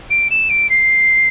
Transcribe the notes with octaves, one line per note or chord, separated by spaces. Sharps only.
D7
E7
D7
C7